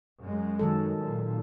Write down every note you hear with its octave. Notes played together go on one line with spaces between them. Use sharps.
F#2 G#3
D#3 F#3 A4
A#2